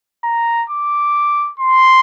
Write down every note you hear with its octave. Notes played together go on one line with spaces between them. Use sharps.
A#5
D6
C6